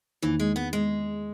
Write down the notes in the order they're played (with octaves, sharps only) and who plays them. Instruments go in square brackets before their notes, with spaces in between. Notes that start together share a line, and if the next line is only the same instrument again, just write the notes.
[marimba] E2 D#3 A#3 D#4 [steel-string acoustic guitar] E3
[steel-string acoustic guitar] G#3
B3
G#3